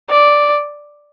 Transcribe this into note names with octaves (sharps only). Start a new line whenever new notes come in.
D5